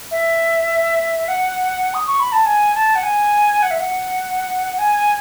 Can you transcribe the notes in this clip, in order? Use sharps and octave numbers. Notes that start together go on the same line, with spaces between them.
E5
F#5
D#6
C#6
B5
A5
G#5
A5
F#5
G#5
F#5
E5
F#5
G#5